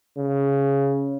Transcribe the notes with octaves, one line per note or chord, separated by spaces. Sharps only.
C#3